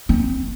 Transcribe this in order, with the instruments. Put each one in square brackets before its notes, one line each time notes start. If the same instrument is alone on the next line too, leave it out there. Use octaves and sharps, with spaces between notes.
[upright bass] C4